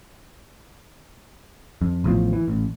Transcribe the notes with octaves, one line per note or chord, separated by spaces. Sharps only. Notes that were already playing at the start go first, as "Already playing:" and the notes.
F2
A1 E2 A2 F3
E3
A1